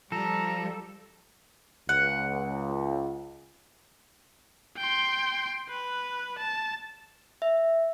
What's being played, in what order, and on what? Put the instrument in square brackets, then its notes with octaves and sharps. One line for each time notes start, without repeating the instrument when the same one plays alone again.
[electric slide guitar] F3 [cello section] G3 [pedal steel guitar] A4 [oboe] A#5
[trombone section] C#2 [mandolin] F#5
[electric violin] G5 C6
B4
A5
[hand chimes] E5